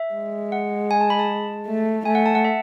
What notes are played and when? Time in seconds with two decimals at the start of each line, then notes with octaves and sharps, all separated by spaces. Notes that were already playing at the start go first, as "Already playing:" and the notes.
Already playing: E5
0.14 G#3
0.52 F#5
0.91 G#5
1.01 A5
1.10 B5
1.19 A5
1.67 A3
2.05 A3 G#5
2.15 F#5
2.26 A5
2.35 F#5
2.45 E5